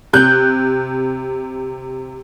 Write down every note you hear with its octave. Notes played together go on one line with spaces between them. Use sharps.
C3 F#6 G6